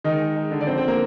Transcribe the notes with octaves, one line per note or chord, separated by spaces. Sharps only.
D#3 G#3 D#4
G#3
G#3
D3
D5
F2 C4 C5
C4 C5
A#3 A#4